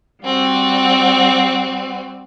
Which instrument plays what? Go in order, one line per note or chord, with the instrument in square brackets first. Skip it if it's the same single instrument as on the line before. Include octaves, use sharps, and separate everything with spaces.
[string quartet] G3 C4 F#4